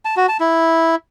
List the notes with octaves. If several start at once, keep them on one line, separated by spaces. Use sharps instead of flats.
A5
F#4
A5
E4